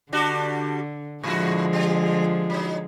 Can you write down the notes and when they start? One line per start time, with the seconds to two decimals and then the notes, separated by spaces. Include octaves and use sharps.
0.12 D3 G3 D4 F#4
1.24 A2 D3 F3 G#3 E4 F#4
1.73 G3
2.50 F#3 D#4